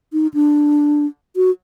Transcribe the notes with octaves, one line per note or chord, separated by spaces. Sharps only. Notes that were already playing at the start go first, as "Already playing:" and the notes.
D#4
D4
F#4